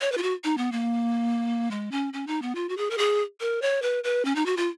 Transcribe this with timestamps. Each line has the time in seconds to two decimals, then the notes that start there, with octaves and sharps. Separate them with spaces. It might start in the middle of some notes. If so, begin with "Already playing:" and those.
0.01 C#5
0.12 B4
0.18 F4
0.23 F#4
0.44 D#4
0.57 B3
0.72 A#3
1.71 G#3
1.91 C#4
2.13 C#4
2.27 D#4
2.42 B3
2.55 F4
2.69 F#4
2.77 G#4
2.91 A#4
2.98 G#4
3.41 A#4
3.62 C#5
3.82 B4
4.04 B4
4.25 C#4
4.36 D#4
4.46 F#4
4.57 F4